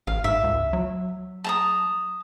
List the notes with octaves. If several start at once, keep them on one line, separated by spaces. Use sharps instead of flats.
A1 F5
G#2 E5
C#2
F#3
A5 A#5 D#6